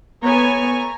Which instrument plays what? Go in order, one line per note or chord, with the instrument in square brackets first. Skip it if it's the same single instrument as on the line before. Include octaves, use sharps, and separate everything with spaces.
[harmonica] A3 A#5 [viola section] B3 C#5 G#5